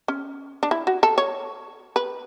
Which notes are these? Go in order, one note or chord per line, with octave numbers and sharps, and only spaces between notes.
C#4
D4
E4
F#4
A4
C#5
B4